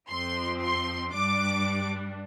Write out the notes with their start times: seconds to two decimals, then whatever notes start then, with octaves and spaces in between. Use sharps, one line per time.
0.09 F2 F3 C4 C6
0.61 C6
1.13 G2 G3 D4 D6